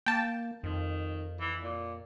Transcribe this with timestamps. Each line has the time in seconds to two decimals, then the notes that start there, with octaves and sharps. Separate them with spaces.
0.06 A#3 G5 A5
0.64 F2 D#3
1.41 E3
1.63 A#2